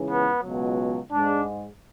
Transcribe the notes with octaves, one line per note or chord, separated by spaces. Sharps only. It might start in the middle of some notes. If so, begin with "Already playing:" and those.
Already playing: C#2 C#3 E3
B3
C#2 B2 F#3
G#2 G#3 D4